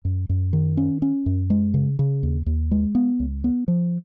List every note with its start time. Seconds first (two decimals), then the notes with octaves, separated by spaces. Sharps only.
0.05 F#2
0.29 F#2
0.53 D#3
0.77 C#4
1.02 C#4
1.26 F#2
1.50 G#3
1.74 C#3
1.99 C#3
2.23 D#2
2.46 D#2
2.71 G#3
2.95 B3
3.20 C#2
3.44 B3
3.68 F3